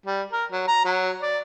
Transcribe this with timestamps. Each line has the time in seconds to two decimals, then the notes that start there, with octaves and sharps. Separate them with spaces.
0.06 G3
0.32 A#4
0.52 F#3
0.68 A#5
0.85 F#3
1.21 D5